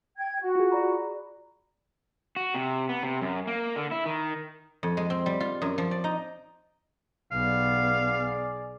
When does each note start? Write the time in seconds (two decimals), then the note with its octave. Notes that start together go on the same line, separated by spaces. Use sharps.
0.17 G5 G#6
0.41 F#4
0.55 F4 G#4
0.71 D5 A#5 B5
2.36 F#4
2.54 C3
2.89 B3
3.03 C3
3.21 F#2
3.47 A#3
3.76 D3
3.91 E4
4.06 D#3
4.83 F2
4.97 G#3
5.10 C4
5.26 G3
5.40 F4
5.62 F#2
5.78 F3
5.91 D5
6.04 D#4
7.32 B1 B3 G#4 D5 F5